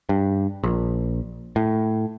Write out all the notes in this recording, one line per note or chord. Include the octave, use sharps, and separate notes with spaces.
G2
A#1
A2